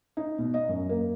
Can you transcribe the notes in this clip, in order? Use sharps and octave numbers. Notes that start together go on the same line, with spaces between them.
D#4
B2
D#5
F#2
A#3